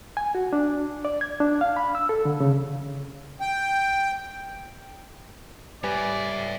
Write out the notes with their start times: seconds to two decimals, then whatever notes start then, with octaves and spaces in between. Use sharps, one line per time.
0.17 G#5
0.35 F#4
0.53 D4
1.05 D5
1.21 G#6
1.40 D4
1.61 F5
1.77 B5
1.95 E6
2.09 A4
2.25 D3
2.40 C#3
3.41 G5
5.84 G3 B4 C#5 D5 E5 G#5